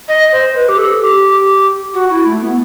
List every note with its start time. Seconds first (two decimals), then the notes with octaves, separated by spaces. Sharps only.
0.08 D#5
0.32 C5
0.55 B4
0.69 G4
0.78 A4
1.01 G4
1.94 F#4
2.10 E4
2.25 A3
2.40 B3